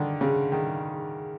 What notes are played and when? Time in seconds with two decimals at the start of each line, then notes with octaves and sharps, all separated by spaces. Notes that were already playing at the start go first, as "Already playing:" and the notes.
Already playing: D3 D#3
0.21 C#3
0.52 D#3